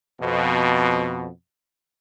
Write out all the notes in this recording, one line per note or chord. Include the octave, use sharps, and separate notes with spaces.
F2 B2